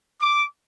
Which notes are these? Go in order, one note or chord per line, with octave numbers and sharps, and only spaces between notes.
D6